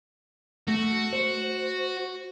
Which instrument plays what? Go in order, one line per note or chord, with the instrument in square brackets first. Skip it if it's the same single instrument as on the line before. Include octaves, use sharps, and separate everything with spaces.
[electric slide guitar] A3 [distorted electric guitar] F#4
[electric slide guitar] C5